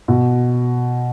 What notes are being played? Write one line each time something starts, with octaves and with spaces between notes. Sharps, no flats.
B2